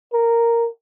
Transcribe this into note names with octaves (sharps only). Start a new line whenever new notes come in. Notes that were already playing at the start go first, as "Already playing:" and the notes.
A#4